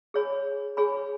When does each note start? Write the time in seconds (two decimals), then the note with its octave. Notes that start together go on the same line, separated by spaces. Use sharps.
0.14 G#4 C#5 G#5 B5
0.77 G#4 C#5 G#5 B5